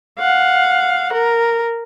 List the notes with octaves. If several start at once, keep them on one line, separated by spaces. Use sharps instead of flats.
F5 F#5
A#4